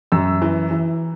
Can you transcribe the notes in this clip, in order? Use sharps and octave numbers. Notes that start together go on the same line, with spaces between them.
F#2 E6
E3
E3